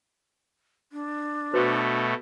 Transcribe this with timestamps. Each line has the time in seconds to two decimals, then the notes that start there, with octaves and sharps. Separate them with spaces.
0.92 D4
1.54 B2 A3 F#4 B4 C5